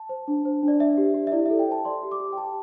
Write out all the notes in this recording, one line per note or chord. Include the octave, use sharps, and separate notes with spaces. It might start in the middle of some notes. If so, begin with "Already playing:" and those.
Already playing: A5
C5
D4
C5
D4
D5
D5 E5
G4
G4
E5
E4 D5
A4 E5
G5
C5 A5
D5 C6
G4
D6
G4
G5
G4 A5